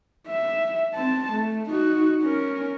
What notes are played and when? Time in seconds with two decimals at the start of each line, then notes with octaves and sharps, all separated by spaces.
0.29 E5
0.95 C4 A5
1.32 A3
1.70 D#4 F#4
2.23 C#4 A#4